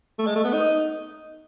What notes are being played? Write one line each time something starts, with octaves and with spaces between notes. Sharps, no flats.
A3
G#3
A3
B3
D#4